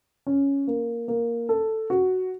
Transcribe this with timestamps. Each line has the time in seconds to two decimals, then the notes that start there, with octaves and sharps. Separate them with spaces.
0.27 C#4
0.67 A#3
1.08 A#3
1.49 A4
1.90 F#4